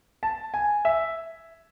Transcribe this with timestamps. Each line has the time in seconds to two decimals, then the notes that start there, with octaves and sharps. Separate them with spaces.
0.23 A5
0.54 G#5
0.85 E5